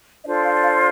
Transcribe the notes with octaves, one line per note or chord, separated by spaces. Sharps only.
D4 F4 A4 C5 D#5
F5
F5